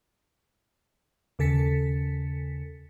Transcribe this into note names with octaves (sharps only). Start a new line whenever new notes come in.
D#2 C#3 A4 A6 B6 C#7